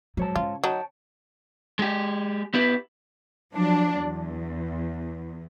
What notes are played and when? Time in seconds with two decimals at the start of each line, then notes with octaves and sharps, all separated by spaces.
0.17 G#2 F#3 C#5 A5
0.36 C#3 F4
0.64 F#3 D#4 C#5 G5 A5
1.79 G#3 G4
2.54 B3 E4 G4 B4
3.53 F3 F#3 D4
3.99 E2